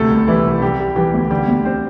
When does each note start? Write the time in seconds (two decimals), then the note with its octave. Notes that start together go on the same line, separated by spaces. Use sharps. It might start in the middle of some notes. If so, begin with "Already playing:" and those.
Already playing: D2 C3 A3 A4
0.11 C2
0.28 E3 G3 E4
0.45 C2
0.61 C3 G3 G4
0.79 G3
0.96 E3 G3 G4
1.14 D2
1.30 D3 G3 G4
1.48 D2
1.65 G3 C4 C5